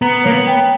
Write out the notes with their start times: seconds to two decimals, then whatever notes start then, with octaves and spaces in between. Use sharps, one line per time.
0.01 B3 A#5
0.24 A#3 C#5
0.33 B3
0.47 G5